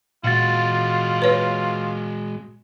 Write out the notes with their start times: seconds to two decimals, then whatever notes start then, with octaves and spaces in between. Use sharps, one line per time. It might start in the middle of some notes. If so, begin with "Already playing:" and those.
0.24 A#2 G#3 F4 F#4 F5 A6
1.22 B4 C#5